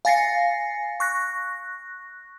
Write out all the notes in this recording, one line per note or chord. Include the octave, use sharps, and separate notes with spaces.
F5 G#5 A6 A#6 C7 C#7
C#6 F#6 A#6